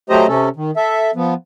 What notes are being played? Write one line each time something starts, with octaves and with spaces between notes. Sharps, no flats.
F#3 A3 G4 C5 D#5 A#5
C3 C#4 A4
D#3
A4 E5
F3 B3